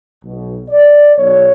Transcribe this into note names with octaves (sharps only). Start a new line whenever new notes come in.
B1 B2
D5
B1 B2 C#5